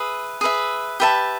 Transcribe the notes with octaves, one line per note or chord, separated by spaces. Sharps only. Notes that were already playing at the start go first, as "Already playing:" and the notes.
Already playing: G#4 B4 E5
G#4 B4 E5
G4 B4 E5 A5